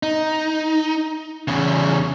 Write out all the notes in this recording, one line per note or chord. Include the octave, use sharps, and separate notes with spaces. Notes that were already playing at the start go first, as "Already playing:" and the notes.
D#4
E2 C#3